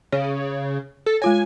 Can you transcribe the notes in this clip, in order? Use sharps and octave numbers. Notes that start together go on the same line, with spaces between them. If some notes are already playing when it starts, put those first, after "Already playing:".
C#3 C#5
A4
G#3 F4 C#5 G#5